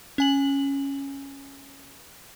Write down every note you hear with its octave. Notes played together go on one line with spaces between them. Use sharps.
C#4 G#5 F#7